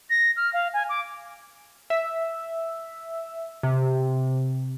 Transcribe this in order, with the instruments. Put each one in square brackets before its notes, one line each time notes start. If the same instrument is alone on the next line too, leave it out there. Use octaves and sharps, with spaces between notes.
[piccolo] A#6
F6
F5
G#5
D6
[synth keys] E5
C3